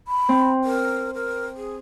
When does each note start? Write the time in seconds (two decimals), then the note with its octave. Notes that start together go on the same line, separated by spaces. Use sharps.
0.08 B5
0.29 C4
0.64 A#4
1.14 A#4
1.57 G#4